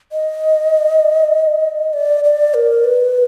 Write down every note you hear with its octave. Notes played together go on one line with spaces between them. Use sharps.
D#5
D5
D5
A#4
B4